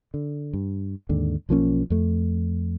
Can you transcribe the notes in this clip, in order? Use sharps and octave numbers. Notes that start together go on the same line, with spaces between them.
D3
G2
D#2 G#2 D3
B1 F3 A#3 C#4
F2 A3